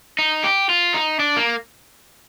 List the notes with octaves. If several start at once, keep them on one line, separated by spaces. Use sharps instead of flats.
D#4
G4
F4
D#4
D4
A#3